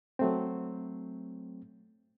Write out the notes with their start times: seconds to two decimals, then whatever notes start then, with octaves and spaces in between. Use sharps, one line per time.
0.19 F#3 A3 C4